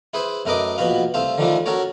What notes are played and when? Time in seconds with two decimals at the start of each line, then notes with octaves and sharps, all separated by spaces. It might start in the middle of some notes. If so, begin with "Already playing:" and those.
0.14 E4 G#4 B4 C5
0.46 F#2 A3 A#4 B4 D#5 D6
0.78 A#1 B2 B3 F#4 B4 F5
1.14 C2 A3 C5 F5
1.38 D3 D#3 F3 G3 A3 D4
1.66 C#4 F#4 A4 A#4 C#5